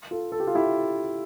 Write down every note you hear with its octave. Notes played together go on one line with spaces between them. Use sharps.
F4 A4
A4
G4
F4
E4 G4